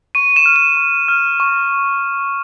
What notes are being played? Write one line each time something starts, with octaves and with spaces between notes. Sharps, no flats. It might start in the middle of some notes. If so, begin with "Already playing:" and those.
C#6 D#7
E7
F6
E7
C#6
F6
C#6